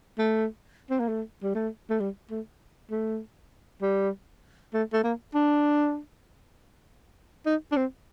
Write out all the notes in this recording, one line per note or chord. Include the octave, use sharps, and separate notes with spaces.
A3
C4
A#3
A3
G3
A3
A3
G3
A3
A3
G3
A3
A3
A#3
D4
D#4
D4
C4